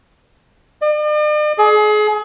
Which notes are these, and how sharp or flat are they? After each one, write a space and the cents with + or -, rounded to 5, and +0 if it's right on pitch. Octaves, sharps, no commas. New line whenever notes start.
D5 +45
G#4 +35